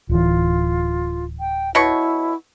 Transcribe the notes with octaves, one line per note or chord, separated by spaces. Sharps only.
D1 E3 F4
G5
B2 E4 C#5 C#6